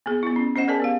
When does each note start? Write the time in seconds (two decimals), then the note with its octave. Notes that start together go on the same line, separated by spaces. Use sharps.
0.06 A#3 B3 G#4
0.23 B3 E4
0.36 C#4
0.56 C#4 C5 D#5 F#5
0.68 G#4 A#4 D5 G#5 A5
0.80 B3 G4 F5